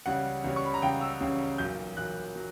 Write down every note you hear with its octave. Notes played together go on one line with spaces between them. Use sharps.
C#2 C#3 G3 C#4 F#5
C#2 C#3 G3 C#4
C#6
B5
A#5
C#2 C#3 G3 C#4 G5
E6
C#2 C#3 G3 C#4
B1 A#2 F#3 G6
B1 A#2 F#3 F#6
F#3